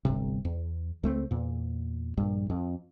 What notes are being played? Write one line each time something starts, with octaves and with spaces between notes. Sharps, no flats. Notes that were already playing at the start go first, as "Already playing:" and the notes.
D1 G1 C3
E2
C#2 A3 C4
E2 A#2
A#1 G2
F2